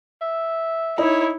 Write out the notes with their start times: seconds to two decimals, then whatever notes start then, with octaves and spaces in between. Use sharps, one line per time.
0.21 E5
0.98 D#4 E4 C#5